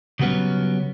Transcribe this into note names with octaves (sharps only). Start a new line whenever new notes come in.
C#3 F#3 G3 B3 C#4